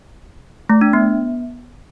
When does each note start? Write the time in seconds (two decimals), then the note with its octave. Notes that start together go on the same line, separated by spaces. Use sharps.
0.70 A3
0.81 D4
0.93 B3